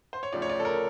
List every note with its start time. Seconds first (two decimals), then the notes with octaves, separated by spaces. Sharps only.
0.13 C5
0.23 C#5
0.33 D2 C#3 F3 D5
0.42 C#5
0.49 D5
0.60 A4
0.65 A#4